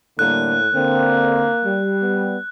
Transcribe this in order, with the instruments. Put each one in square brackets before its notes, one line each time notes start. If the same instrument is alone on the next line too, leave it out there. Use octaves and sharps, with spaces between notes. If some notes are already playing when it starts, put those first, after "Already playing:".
[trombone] A2 [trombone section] D3 G3 A#3 [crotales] F#6
[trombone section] D3 C4 [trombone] A#3
[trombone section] G3
[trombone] B3